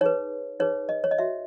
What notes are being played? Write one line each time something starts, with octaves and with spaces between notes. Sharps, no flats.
D#4 G#4 B4 C#5
D#4 G#4 B4 C#5
D#5
C#5
D#5
F#4 C#5 E5